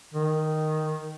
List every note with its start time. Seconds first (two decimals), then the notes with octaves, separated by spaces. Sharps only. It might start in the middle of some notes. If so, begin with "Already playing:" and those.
0.14 D#3